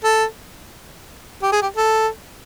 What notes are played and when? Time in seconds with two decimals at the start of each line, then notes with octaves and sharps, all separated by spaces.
0.04 A4
1.42 G4
1.52 G#4
1.62 G4
1.76 A4